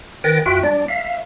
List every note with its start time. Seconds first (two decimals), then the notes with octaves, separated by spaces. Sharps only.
0.24 D#3 B4 G5 A6 A#6
0.46 F#2 F4 F#4 E5 G5 F#6
0.63 G3 D4 D5
0.88 E5 F5